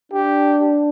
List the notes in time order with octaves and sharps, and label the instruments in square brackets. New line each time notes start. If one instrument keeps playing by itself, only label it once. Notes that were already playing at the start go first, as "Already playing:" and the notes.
[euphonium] D4 [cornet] G4